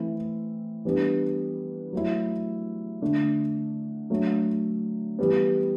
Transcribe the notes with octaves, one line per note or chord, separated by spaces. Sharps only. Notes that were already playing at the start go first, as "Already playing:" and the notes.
Already playing: E3 A3 C4 E4
E3 G3 B3 D4
F#3 A3 E4
D3 A3 D4
F#3 A3 D4
E3 G3 B3